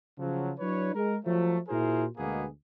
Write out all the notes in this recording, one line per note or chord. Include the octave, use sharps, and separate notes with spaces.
C#3 F3 F#3
F#3 D4 E4 B4 C#5
G#3 A#4
F3 F#3 A3
A#2 E4 F#4 G#4 A#4 C5
D2 B2 G#3 A#3 B3 G#4